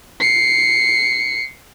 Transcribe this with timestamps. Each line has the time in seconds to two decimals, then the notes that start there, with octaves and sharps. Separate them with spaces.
0.20 C7 C#7